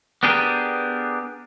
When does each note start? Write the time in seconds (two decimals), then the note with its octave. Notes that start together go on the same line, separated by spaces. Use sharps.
0.23 B3 D4 G4 G#4 A#4